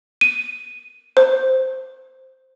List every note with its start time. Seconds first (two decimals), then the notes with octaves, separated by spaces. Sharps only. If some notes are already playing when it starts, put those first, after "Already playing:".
0.21 D#7
1.17 C5